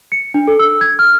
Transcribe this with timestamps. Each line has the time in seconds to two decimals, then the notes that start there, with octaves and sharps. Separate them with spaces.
0.12 C#7
0.34 D4
0.48 A4
0.59 E6
0.81 G#6
0.99 F6